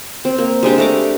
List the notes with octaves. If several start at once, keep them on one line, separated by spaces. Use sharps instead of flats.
C4
A#3
G3 G#3 D4 G4
A3 A#5 D6